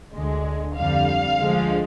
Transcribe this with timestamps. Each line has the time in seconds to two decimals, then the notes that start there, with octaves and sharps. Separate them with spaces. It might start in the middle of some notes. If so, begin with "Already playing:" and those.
0.14 D2 D3 G#3
0.76 F2 D3 G3 F5
1.39 D2 D3 F3 G#3